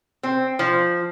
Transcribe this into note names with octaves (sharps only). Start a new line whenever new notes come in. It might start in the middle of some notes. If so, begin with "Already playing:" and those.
C4
F3